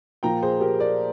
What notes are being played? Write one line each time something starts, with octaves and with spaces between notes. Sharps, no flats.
A#2 F3 A#3 G5 A#5
G#4 C5
G4 A#4
A#4 D5